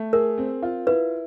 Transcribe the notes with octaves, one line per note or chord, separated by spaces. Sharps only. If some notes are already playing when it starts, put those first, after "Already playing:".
Already playing: A3
G#4 A#4
C4
F4
E4 B4